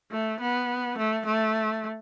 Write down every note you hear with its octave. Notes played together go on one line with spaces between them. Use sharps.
A3
B3
A3
A3